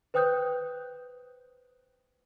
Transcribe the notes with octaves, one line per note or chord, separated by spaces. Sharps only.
B4 C5 G5 D#6 F#6 G6